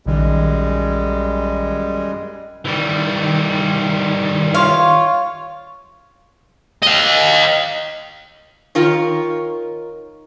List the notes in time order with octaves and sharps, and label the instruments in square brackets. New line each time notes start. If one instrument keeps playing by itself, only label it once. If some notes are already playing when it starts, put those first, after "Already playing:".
[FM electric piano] A#1 D#3 [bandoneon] F#2 G3 G#3
[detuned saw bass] D#3 [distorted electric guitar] E3 G3
[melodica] F4 C#5 [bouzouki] F5
[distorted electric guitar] D#5 F5
[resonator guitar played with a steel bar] D#3 F4 A#4 C#5